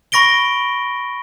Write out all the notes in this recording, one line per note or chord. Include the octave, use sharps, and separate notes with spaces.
B5 C#6 A#6 D7 G7